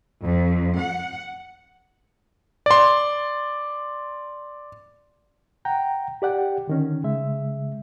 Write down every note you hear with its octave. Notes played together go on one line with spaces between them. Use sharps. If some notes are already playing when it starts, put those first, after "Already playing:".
F2
F#5
D5 C6
F#5 G5 A#5
G4 D5 F#5 G5
D3 D#3 C#4
C#3 G#3 E5